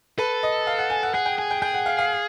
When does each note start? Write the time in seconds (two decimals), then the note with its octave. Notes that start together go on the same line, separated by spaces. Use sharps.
0.18 A4 B4
0.43 D#5
0.67 F5
0.78 F#5
0.90 G#5
1.03 F#5
1.14 G#4 F#5
1.26 G5
1.38 G#4 G#5
1.51 G5
1.62 G#4 G5
1.74 F#5
1.86 F5
1.99 F5